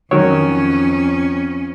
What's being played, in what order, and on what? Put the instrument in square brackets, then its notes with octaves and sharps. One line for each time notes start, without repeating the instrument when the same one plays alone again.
[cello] F2 C#4 [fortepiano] D#3 F#3 [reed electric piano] C#5